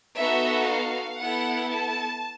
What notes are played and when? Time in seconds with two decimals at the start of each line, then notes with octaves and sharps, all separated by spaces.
0.17 B3 D#4 F#4 A4 E5
0.69 F5
1.20 B3 E4 A4 F#5
1.72 A5